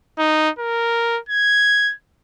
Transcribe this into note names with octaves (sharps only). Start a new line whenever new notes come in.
D#4
A#4
G#6